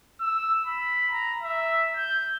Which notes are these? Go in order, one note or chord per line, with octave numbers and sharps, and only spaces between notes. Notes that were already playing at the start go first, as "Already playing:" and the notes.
E6
B5
A#5
E5
G6